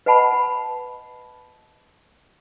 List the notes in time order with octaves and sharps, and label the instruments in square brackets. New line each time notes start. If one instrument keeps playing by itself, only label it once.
[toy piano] B4 D#5 F#5 A5 B5